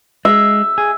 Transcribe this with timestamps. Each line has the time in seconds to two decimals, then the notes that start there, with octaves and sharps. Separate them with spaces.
0.25 G#3 E5
0.78 G#4